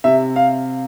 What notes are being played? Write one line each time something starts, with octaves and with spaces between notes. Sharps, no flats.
C3 E5
F5